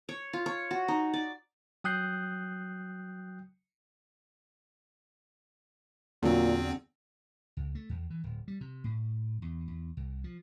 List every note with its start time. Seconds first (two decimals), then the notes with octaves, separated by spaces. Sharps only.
0.09 C#5
0.33 F4
0.46 C#5
0.71 F#4
0.88 D#4
1.14 D5
1.84 F#3 G5 D#6 F#6 G6 C7
6.23 E2 A#2 D3 F#3 C4
7.57 C#2
7.75 A3
7.89 E2
8.10 E3
8.24 D1
8.48 G3
8.61 C3
8.84 A2
9.42 E2
9.68 E2
9.97 C2
10.24 F3